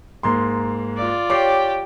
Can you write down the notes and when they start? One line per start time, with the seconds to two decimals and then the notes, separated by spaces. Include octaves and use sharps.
0.23 G#2 A#3 C6
0.97 F4 D5
1.30 G4 C#5 D6 C7